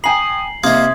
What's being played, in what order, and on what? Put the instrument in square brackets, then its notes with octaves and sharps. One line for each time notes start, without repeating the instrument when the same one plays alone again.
[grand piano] G5 G#5 A#5 [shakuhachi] D#6 [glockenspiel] C7 F#7
[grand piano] C3 [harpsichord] A#3 D#4 [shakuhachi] E5 [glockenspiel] C6 D#6 G#6